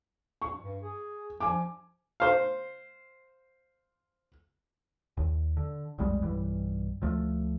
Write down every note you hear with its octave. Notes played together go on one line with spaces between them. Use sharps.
C#6
G2
G#4
F3 G#5 D6
C5 F5
D#2
D3
B1 F2 G3 G#3
B1 G2 E3 G3
D2 F3 A3